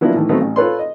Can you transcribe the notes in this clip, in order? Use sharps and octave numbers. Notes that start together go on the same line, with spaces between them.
F3 F#3 A#3 B3 D4 E4
A2 D#3 E3
D#3 F#3 A3 B3 C4 D#4
A1
F4 A4 B4 C#5 C6
D#5